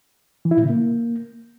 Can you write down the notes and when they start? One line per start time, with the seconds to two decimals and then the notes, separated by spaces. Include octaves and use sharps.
0.45 E3
0.51 E4
0.57 A#2
0.63 C#3
0.70 A#3